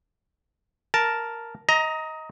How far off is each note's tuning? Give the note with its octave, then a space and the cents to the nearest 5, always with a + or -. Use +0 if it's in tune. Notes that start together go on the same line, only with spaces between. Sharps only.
A#4 +0 A5 +0
D#5 +20 A#5 +0